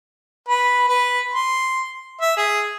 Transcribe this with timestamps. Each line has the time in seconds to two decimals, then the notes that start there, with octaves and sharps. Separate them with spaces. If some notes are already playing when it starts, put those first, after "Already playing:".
0.49 B4
0.88 B4
1.34 C6
2.21 E5
2.37 G#4